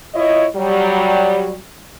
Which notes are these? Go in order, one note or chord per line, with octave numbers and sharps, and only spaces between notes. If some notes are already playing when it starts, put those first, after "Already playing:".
E4 F4 C#5 D#5
F#3 G3